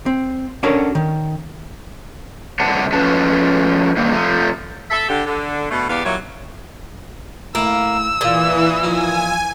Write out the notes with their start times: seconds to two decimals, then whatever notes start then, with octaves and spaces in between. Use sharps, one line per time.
0.06 C4
0.63 C#4 D4 F#4 A4 A#4 C#5
0.95 D#3
2.60 C3 G3 D4 F#5 A5
2.92 F3 A3 C#4 B4 A5
3.97 G2 D#3 A#3 C4
4.12 C3 F3 A3
4.91 A4 E5
5.08 D3 G4
5.26 D3
5.70 B2 D3 A3
5.88 E2 B3 G4 D5 F5
6.04 A#2 F#3 G3 E4 F4 C#5
7.55 A2 A#3 E5 B5 E6
8.21 A#2 E3 F4 G#4
8.83 F3 D#4 F4 G#5